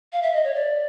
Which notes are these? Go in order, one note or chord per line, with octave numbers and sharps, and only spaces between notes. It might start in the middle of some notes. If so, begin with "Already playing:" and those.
F5
E5
D#5
C#5
D5